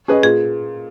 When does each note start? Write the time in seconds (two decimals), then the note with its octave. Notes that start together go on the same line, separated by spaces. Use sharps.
0.08 C#4 G#4 B4 D#5
0.23 A#2 G#4